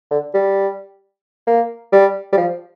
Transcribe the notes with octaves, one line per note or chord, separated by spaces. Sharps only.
D3
G3
A#3
G3
G3
F3